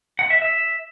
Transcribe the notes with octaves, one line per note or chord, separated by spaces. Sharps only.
F#5
E5
E5